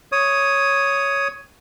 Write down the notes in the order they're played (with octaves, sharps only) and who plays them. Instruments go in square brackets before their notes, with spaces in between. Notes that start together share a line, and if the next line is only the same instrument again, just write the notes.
[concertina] C#5 D#6